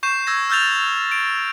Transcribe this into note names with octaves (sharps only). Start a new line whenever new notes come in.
C#6 G6 C7 E7
E6 G#6 A#6
E6 F6 G6 A6 F7
D7